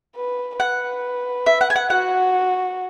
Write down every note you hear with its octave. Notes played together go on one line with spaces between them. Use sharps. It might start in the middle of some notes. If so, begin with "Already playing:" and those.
B4
B4 F#5
E5
F#5
G#5
F#5
F#4 F#5